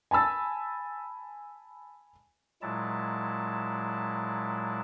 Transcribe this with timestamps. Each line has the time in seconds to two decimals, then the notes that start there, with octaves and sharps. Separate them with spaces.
0.11 G#5 A5 B5 E6 A6
2.62 A#2 F#3 G#3 E4 A5